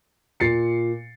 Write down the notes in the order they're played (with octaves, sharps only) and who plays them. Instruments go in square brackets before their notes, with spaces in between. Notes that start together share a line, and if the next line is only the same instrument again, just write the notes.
[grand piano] A#2 A6 C7 C#7